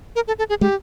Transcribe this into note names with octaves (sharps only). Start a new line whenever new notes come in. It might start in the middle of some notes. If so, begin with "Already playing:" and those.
A#4
A4
A4
G#4
G#3 G4